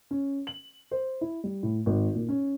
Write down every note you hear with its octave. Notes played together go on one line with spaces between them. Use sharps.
C#4
F#7
C5
E4
G3
A2
G#1
A#2
C#4